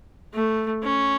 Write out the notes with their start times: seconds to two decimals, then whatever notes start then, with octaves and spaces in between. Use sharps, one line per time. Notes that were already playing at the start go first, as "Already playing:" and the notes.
0.33 A3
0.83 C#4